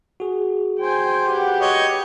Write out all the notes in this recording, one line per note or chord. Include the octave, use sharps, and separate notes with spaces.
F#4 G#4
C5 G5 G#5
G4 B4 F#5
C#5 D#5